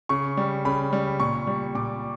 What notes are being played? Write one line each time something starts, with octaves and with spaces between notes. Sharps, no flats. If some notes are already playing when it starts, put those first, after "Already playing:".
C#3 C#6
G3
C#3 B5
G3
A#2 C#6
G3
A#2 D6